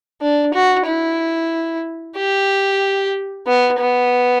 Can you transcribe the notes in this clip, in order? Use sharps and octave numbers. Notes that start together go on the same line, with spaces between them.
D4
F#4
E4
G4
B3
B3